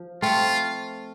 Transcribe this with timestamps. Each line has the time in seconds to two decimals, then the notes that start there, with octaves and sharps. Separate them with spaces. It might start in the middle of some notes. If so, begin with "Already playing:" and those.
Already playing: F3
0.22 A3 C4 F4